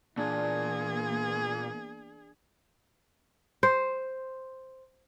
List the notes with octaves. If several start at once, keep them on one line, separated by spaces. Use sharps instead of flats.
A#2 E3 A#3 B3 D4 G#4
C5